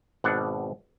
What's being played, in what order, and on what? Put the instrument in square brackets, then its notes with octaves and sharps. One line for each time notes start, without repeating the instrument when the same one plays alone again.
[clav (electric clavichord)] G#1 B2 D4 F#5